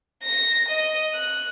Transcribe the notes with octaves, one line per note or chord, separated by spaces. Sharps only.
A#6
D#5
F#6